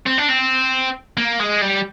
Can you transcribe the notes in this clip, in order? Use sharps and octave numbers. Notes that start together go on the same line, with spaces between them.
C4
D4
C4
A#3
G#3
G3